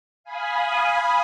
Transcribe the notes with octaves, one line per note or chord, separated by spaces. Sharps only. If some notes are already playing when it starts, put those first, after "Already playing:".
F5 G#5 B5 D#6